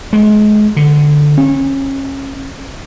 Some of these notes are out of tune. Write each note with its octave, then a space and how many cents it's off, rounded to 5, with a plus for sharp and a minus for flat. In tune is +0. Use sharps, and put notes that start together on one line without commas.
G#3 +30
D3 +5
C#4 -30